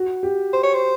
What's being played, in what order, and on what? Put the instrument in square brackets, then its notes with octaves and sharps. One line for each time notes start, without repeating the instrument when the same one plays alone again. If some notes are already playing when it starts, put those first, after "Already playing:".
Already playing: [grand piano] F#4
G4
[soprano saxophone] C5
C#5
C5